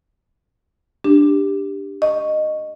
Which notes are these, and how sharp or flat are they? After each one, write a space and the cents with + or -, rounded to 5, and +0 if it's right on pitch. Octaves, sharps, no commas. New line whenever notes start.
D4 +0 G4 +10
D#5 -10 C#6 +0